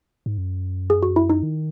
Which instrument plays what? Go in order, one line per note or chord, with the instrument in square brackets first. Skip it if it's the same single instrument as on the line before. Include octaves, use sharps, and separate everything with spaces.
[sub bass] G#2
F#2
[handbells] G#4
F#4
E4
D#4
[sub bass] D#3